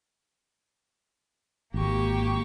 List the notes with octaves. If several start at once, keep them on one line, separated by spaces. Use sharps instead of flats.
G#1 A#3 G4 C#6